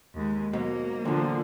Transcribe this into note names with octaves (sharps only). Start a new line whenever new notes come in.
D#2 G#3
G#2 B2 F#3 A#3
E2 A#2 D3 F3